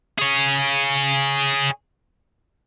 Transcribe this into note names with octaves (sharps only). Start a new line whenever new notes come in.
G#4 C#5